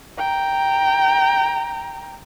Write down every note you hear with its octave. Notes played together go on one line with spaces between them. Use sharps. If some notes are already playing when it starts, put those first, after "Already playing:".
G5 A#5